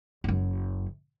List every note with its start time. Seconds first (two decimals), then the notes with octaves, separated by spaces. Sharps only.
0.24 F#1 F#2